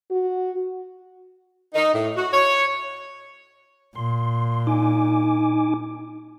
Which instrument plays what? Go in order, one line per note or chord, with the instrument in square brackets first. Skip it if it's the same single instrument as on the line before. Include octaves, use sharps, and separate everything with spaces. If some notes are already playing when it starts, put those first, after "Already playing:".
[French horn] F#4
[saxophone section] D#4
A2
F#4
C#5
[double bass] A#2 [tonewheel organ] C6
[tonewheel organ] D#4 G#5 D6